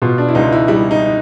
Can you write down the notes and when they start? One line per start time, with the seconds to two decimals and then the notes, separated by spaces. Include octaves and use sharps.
0.02 B2 F4
0.18 D4
0.28 E4
0.35 C#2 D#4
0.52 E4
0.68 G3 E4
0.91 D#4